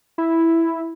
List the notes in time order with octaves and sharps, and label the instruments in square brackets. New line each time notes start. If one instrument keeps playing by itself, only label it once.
[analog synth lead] E4